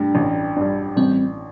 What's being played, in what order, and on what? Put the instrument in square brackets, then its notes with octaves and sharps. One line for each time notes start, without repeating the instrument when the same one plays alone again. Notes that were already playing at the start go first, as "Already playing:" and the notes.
Already playing: [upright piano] G2 G3 [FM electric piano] A3 D4
[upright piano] A1
G2 G3
[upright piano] A1 [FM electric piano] G3 C4